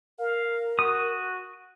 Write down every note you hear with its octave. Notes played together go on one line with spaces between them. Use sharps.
A#4 F5
F#4 D#6